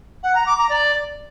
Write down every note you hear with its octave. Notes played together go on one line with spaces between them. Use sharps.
F#5
A#5
D6
A#5
D5